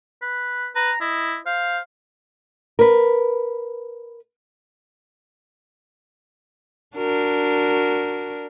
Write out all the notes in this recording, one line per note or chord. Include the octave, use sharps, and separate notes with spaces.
B4
B4 A#5
E4 D#5
C5 F5
A#4 B4
D4 F#4 A#4